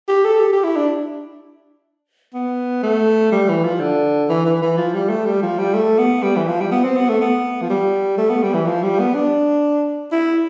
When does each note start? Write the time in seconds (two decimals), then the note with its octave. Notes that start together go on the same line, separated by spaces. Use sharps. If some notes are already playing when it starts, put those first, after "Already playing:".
0.08 G4
0.24 A4
0.40 G4
0.53 G4
0.64 E4
0.76 D4
2.34 B3
2.83 A3
3.32 G3
3.49 E3
3.64 F3
3.80 D3
4.29 E3
4.46 E3
4.62 E3
4.77 F3
4.94 G3
5.10 A3
5.26 G3
5.43 F3
5.58 G3
5.74 A3
5.99 B3
6.23 G3
6.36 E3
6.48 F3
6.60 G3
6.72 B3
6.84 C4
6.97 B3
7.09 A3
7.21 B3
7.62 F3
7.70 G3
8.18 A3
8.30 B3
8.43 G3
8.54 E3
8.66 F3
8.83 G3
9.00 B3
9.15 D4
10.12 E4